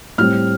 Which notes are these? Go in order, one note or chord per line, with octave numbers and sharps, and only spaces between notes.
A2 G3 C4 F6